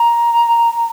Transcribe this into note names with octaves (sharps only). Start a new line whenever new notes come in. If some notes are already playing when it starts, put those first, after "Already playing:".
Already playing: A#5